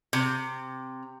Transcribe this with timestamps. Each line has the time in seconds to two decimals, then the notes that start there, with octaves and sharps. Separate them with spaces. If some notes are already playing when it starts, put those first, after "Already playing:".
0.13 C3